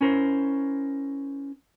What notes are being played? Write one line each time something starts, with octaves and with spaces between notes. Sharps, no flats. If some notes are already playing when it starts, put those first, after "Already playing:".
C#4 E4 A#4 C5